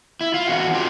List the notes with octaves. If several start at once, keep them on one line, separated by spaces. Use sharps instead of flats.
E4
F4
E2 C3 F#4
F4 G4